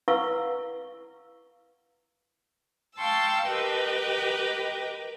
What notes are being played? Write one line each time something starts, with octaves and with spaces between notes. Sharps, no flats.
E4 B4 F5 F#5 C#6 E6
F5 G5 A5 C6 C#6 E6
G4 A#4 B4 D#5 G5